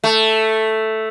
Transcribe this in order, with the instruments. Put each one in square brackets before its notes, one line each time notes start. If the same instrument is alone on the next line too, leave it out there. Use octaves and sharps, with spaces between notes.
[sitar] A3